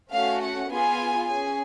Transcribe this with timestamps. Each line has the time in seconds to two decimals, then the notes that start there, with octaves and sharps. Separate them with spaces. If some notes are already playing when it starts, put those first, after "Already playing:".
0.12 A3 C#4 F#4 F5
0.42 F#5
0.70 B3 F4 G#4 G#5
1.28 C#4 G#4 G#5